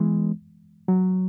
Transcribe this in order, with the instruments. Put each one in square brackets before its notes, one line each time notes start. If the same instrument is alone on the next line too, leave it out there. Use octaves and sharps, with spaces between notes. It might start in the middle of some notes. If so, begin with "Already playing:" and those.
Already playing: [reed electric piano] E3 G#3 B3
F#3